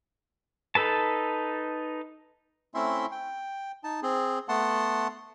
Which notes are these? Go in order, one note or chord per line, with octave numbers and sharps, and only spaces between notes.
D#4 A4 B4 A5
A3 C4 C#4 E4 E5 C6
G5
D#4 A5
C4 G#4
A3 B3 F#5 A5 C6